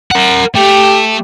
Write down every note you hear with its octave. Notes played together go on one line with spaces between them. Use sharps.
A#4 F#5
A3 G4